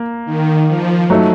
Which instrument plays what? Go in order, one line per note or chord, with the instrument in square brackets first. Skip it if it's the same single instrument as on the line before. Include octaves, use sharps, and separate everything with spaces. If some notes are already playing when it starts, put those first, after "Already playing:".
Already playing: [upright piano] A#3
[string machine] D#3
F3
[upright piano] F#3 A3 D#4